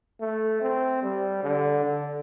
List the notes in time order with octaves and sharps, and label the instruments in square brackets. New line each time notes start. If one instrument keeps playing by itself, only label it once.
[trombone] A3
C4
G3
D3
D3